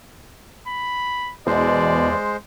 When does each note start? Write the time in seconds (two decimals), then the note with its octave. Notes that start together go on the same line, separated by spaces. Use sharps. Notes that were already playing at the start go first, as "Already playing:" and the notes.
0.68 B5
1.47 E2 B2 G#3 C5 D5